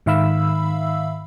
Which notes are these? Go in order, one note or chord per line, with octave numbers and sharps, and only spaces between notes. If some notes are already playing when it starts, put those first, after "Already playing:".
G#2 D#3 E5 F5 B5 E6